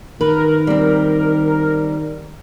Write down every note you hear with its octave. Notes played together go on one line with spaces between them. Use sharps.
D#3 A#4 B4
G3 C4